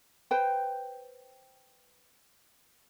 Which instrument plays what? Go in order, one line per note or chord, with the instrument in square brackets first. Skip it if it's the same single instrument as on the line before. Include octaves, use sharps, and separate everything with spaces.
[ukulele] B4 C5 G5